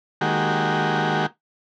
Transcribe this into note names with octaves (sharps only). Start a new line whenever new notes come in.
D#3 G#3 A#3 F#4 G4